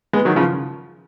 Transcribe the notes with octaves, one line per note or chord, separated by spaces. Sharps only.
G#3 B3
D#3 F#3
C#3 F3